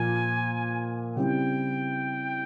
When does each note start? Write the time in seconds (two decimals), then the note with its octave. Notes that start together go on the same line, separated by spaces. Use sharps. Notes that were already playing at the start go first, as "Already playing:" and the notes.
Already playing: A#2 F3 A#3 G#5
1.16 C#3 G3 C4 E4 G5